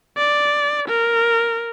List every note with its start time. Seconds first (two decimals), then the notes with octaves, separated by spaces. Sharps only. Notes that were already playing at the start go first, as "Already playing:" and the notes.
0.17 D5
0.88 A#4